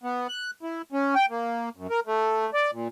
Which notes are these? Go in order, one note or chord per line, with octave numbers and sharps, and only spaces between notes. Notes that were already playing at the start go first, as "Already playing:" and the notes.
B3
F#6
E4
C#4
G5
A#3
F#2
A#4
A3
D5
A#2